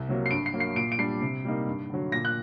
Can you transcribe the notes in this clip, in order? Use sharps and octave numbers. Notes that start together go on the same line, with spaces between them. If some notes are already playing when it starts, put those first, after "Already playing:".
Already playing: C2
C3 F#3 A#3
C7
G2 D7
C7
F#3 A#3
C7
A#2 D7
D7
G3 D4 C7
C3
G3 A#3 D#4
G2
D3 F#3
A#2 A#6
F#6